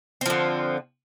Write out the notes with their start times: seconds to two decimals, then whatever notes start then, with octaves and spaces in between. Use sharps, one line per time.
0.21 C4
0.26 F3
0.30 D3